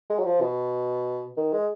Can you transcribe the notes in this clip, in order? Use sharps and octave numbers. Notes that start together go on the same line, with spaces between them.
G#3
F#3
F3
B2
D#3
G#3